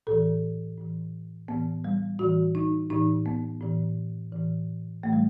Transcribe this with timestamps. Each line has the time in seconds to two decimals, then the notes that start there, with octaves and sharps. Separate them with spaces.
0.07 A2 E3 A4
0.78 A2 E3
1.48 A2 E3 B3
1.84 G3
2.19 A2 E3 F#4
2.55 D#4
2.90 A2 E3 D#4
3.26 B3
3.61 A2 E3
4.32 A2 E3
5.03 A2 E3 A3
5.13 G3